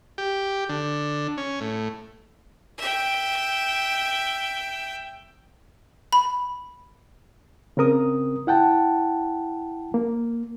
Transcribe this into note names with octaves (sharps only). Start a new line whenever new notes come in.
G4
D3
C#4
A2
E5 G5
B5
C#3 C4 A#4 D#6
E4 F#5 G5 A5
A#3